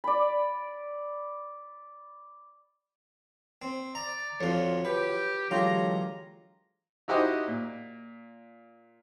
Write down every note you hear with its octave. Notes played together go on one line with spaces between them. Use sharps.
D5 B5
C4
D5 A#5
F2 F3 F4 F#4 C#5
G4 B4
E2 D3 F#3 G#3 F4 G4 C#5 A#5
D#4 E4 F#4 G4 C5 D#5
A#2